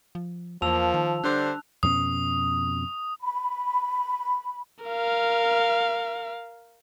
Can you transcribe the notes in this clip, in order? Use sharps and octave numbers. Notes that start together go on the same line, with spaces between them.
F3
E2 F3 A#3 A5 E6 F7
D#3
D3 G3 D4 C5 F#6
F2 B2 C#4 D#6
B5
A#4 F5